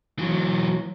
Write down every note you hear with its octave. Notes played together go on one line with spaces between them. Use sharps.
E3 F#3